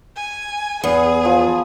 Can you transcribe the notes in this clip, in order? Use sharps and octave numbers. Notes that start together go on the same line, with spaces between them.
G#5
E2 B3 G#4
F3